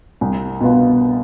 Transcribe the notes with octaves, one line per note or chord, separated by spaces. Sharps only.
C2
B2 B3 F4